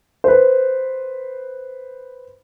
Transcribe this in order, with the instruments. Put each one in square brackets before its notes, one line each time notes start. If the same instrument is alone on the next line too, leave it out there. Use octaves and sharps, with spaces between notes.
[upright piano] B4 C5